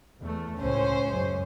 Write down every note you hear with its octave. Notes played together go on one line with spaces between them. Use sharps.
E2 A3
C#2 A2 C#4 C5
C#2 F#2